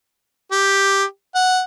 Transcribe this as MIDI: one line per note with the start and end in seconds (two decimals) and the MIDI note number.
0.52 1.04 67
1.35 1.62 78